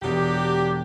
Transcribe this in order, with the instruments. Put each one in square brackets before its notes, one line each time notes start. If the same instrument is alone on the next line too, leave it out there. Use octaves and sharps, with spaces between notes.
[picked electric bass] E1 E2 [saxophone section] F#3 D4 G4